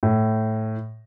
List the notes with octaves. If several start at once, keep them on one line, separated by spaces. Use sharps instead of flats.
A2